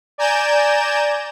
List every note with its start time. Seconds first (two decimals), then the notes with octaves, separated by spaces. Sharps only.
0.18 D5 G#5 A#5 G6 E7